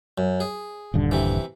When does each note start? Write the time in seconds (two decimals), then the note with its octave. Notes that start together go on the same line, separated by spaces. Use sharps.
0.18 F#2
0.40 G#4
0.94 D#1 G2 D3
1.11 C3 E3